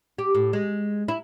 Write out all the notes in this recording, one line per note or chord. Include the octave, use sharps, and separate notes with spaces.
G4
A2
G#3
E4